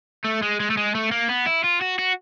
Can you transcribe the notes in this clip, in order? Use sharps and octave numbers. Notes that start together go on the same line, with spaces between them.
A3
G#3
G#3
A3
G#3
A3
A#3
B3
E4
F4
F#4
F#4